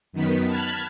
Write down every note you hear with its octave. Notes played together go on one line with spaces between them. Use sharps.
F#2 D#3 B3 B6
A5 B5 F6 F#6 G#6 B6